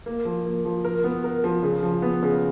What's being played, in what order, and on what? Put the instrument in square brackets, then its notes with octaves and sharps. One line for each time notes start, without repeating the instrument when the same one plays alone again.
[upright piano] A#3
F3
A#3
F3
A#4
B3
A#4
F3
C#3
F3
B3
C#3